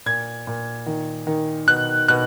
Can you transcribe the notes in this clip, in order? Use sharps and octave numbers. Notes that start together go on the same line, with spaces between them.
A#2 G#6
A#2
D#3
D#3
B2 F#6
B2 F#6